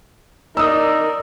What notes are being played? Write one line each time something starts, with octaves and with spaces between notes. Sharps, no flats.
D#4 A#4 D5 D#6 E6